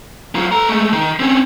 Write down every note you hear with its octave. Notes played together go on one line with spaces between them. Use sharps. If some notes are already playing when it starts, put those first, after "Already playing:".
F#3 F4
A4 A#5
G#3 A3
D#3
C4 C#4